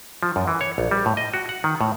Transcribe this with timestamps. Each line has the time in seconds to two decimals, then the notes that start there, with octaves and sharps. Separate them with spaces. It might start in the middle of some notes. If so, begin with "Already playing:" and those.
0.23 F3
0.36 F#2
0.48 E3
0.61 C#5
0.78 A#1
0.91 G3
1.06 A2
1.17 D#5
1.34 F#4
1.49 F#5
1.64 D#3
1.81 A2